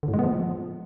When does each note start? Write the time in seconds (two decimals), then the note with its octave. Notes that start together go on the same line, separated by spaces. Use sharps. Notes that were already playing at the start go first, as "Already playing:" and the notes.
0.03 D3
0.08 A2
0.14 G#3
0.19 B3
0.24 F3